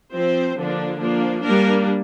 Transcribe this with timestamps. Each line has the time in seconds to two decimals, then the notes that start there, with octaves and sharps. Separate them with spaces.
0.14 F3 C4 C5
0.57 D3 F3 A#3 D4
1.00 F3 A#3 D4
1.44 G3 A#3 D4 A#4